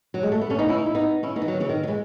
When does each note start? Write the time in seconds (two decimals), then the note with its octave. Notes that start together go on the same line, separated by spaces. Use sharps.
0.14 F#3
0.23 G#3
0.32 A3
0.41 B3
0.50 A3 C#4
0.59 B3 D#4
0.69 C#4 E4
0.78 D#4
0.86 E4
0.95 B3 D#4
1.23 C#4 E4
1.36 B3 D#4
1.42 E3
1.48 D#3 F#3
1.60 C#3 E3
1.69 D#3
1.83 F#3
1.87 E3 G#3